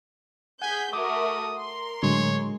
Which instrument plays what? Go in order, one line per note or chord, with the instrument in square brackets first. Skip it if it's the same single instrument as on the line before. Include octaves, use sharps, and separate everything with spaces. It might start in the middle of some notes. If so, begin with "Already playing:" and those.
[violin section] G#4 G6 B6 [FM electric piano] F#5 [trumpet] G#5
[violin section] A3 F#4 A#4 [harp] D6 [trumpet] D#6
[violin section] A#4 C6
[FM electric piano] A2 D3 F#3 [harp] G#3 [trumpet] C#5